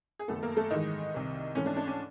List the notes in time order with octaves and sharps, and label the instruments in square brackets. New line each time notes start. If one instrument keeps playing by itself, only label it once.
[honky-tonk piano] G#4
F#1 F#2 D#3 F#3 A3 B3 A4
A#3 A#4
A3 A4
G#2 D#3 E3 G#3 D#4
C2 C3 D#3
G#2 E3 A3 C#4
D4
D4
C#4